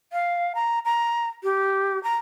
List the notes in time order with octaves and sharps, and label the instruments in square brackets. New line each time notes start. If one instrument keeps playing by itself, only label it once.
[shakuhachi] F5
A#5
A#5
G4
A#5